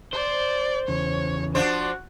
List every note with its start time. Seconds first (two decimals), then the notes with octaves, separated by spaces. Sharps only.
0.14 C5 D5
0.88 E2 C#3 C#5
1.55 F3 D4 F#4 C5